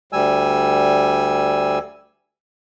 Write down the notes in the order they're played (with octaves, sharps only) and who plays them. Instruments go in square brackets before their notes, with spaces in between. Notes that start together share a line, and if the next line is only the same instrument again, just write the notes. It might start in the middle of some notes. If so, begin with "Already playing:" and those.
[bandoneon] D2 G3 G#5 E6